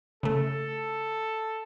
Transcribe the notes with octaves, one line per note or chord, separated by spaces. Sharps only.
C#3 A3 A4